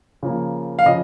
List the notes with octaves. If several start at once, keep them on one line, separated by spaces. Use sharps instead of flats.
C#3 F3 A#3
F5
C#3 F3 D#5